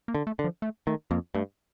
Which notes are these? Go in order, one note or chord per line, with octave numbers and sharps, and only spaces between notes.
A#3
D3
A3
D3
F3
A3
D#3 A3
F2 A#3
G2 A3